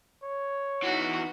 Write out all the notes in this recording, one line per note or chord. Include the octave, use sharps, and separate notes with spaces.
C#5
E2 E3 B3 D#4 F#4